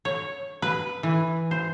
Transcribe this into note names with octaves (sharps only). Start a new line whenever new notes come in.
C#5
B4
E3
C5